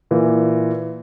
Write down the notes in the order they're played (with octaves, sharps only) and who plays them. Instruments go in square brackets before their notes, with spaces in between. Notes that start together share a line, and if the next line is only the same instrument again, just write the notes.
[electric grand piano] A#2 E3